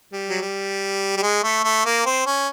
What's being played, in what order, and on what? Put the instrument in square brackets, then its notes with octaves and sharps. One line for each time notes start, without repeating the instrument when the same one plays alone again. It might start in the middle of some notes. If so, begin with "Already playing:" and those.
[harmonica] G3
F#3
G3
G3
G#3
A3
A3
A#3
C4
C#4